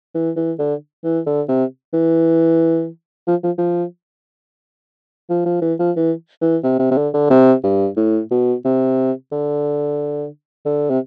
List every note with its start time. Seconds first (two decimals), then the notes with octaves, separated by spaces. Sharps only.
0.15 E3
0.36 E3
0.59 D3
1.04 E3
1.26 D3
1.49 C3
1.94 E3
3.27 F3
3.43 F3
3.58 F3
5.30 F3
5.46 F3
5.62 E3
5.79 F3
5.96 E3
6.41 E3
6.64 C3
6.79 C3
6.91 C3
6.97 D3
7.14 D3
7.30 C3
7.64 G2
7.97 A2
8.31 B2
8.65 C3
9.32 D3
10.66 D3
10.90 C3